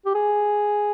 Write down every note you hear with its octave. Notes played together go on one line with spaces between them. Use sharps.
G4
G#4